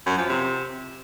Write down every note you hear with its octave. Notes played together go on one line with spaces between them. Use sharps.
F#2
F3
C3